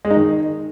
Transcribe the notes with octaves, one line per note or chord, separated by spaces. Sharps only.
G#3
D#4
D#3